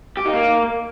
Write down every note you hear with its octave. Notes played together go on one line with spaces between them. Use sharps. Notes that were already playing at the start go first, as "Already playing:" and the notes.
G4
D#4
A#3